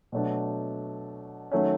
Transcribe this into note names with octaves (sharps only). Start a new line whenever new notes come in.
B2 F#3 A3 D4
D#3 F#3 A3 C#4